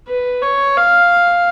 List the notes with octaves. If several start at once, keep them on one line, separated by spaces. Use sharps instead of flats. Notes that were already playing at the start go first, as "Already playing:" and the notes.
B4
C#5
F5